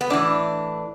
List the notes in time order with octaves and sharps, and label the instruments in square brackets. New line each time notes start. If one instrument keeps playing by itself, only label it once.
[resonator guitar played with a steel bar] B3
A2 E3 D4